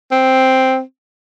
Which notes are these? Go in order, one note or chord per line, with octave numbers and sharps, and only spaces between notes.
C4